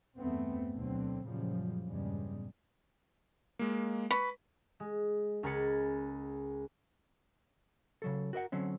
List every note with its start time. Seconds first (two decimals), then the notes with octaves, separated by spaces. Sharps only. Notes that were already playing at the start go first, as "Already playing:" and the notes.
0.17 E2 G2 A3 B3 C4
0.72 D2 B2 D3 F#3 C4
1.26 F#2 A#2 C#3 F3 G3
1.88 E2 G2 A#2 C#3 G3 G#3
3.59 G#3 A#3
4.11 B4 B5 C#6
4.80 G#3
5.43 C#2 A#4 G#5 B5 A6 C#7
8.02 C#3 F#3 A4
8.33 F#4 A#4 D#5 F#5
8.52 D3 F#3 C4 C#4